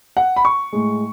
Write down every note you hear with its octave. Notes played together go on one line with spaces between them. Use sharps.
F#5
B5
C#6
A2 G#3